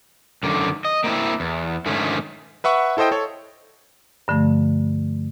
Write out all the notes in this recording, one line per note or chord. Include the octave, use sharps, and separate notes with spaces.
F#2 D3 D#3
D#5
A#3 C4 D4 E4 E5
E2
G#2 D3 D#3 F3 A3 C#4
B4 E5 F#5 C#6
E4 A4 C5 D#5 G5
A4 C#5
G2 D3 F3 A3